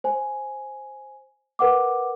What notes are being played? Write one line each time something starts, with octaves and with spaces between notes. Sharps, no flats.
C5 G#5
A#4 B4 F#5 D6